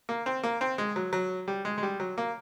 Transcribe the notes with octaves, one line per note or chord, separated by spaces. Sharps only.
A#3
C4
A#3
C4
G#3
F#3
F#3
G3
G#3
G#3
G3
F#3
A#3